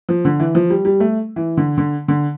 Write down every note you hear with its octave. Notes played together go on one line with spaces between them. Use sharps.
F3
D3
E3
F3
G3
G3
A3
E3
D3
D3
D3